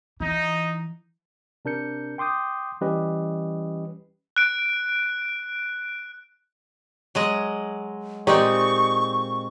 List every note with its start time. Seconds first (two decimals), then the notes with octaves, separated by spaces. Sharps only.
0.20 E3 D#4
1.65 C3 D4 A#4 G6 C#7
2.18 G5 C6 D6 D#6 G6
2.81 E3 G3 C#4 G4 B4 D#5
4.36 F#6 D7
7.15 F#3 G#3 D#5
8.27 A#2 G#3 C4 D#4 G4 D5 C#6